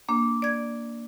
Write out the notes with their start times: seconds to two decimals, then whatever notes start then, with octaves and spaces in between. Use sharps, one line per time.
0.09 A#3 D4
0.42 D5 G#6